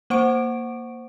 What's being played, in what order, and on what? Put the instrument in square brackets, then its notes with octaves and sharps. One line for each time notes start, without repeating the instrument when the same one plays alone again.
[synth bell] A#3 C5 F#5 C#6 D7